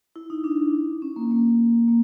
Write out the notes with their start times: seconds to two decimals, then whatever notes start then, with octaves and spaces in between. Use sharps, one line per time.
0.16 E4
0.30 D#4
0.44 D4
1.02 C#4
1.16 A#3
1.31 A#3
1.88 A#3